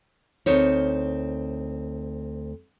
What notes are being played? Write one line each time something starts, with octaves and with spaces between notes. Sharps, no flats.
D2 C4 D#4 A#4 C#5